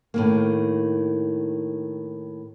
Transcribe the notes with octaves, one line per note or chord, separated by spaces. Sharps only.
A2 D#3 A#3